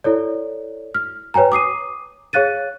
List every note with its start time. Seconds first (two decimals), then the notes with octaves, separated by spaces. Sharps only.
0.04 E4 A4 C#5 D5
0.94 F6
1.34 B4 C#5 G5 G#5 A#5
1.52 D6 D#6 C7 D#7
2.33 G#4 C#5 F5 F#6 A6 D#7